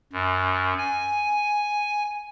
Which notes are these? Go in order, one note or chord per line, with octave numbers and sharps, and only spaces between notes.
F#2
G#5